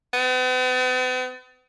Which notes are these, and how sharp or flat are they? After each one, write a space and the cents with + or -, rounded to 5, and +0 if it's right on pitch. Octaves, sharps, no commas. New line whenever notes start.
B3 +45